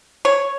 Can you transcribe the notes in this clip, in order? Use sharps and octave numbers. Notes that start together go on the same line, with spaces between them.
C#5